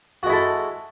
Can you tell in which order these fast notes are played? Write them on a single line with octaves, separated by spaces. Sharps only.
F#4 G#3 E4 A4